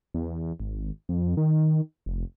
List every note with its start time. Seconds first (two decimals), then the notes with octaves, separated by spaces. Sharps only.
0.14 E2
0.60 G#1
1.09 F2
1.37 D#3
2.06 F1